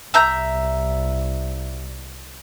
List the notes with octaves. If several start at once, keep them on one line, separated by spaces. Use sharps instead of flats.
C2 E5 A#5 G6